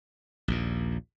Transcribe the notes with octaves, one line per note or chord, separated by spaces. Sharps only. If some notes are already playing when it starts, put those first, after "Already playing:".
A#1 D#2 A#2